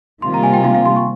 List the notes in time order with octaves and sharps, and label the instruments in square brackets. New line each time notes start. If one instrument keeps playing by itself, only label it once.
[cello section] C3 D#3 G3 A#3 F4 [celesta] C6
[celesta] A#5
G#5
G5
F5
F5
C6
C#6